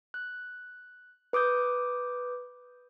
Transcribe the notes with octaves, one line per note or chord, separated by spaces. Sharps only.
F#6
B4 D6 D#6 G6